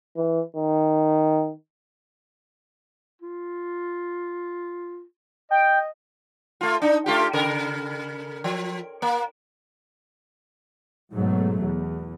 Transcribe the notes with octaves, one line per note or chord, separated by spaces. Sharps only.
E3
D#3
F4
D#5 G5
A3 F4
D4 D#4
A3 F4 G4
C#3 A#4
F3
A#3
G#2 B2 F#3 A3
E2